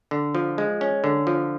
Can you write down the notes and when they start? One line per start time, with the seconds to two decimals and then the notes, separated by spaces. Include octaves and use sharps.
0.11 D3
0.35 F3
0.58 G#3
0.81 C#4
1.04 D3
1.27 F3